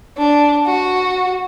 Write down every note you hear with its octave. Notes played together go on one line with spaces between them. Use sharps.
D4
F#4